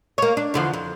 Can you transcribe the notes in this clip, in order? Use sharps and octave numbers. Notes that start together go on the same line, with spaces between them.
A#3 C#5
D4
E2 D3 F3
F2